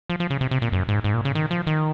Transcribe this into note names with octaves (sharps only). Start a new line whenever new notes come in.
F3
F3
C#3
C3
C3
A#2
F#2
G#2
G#2
A#2
C#3
D#3
F3
D#3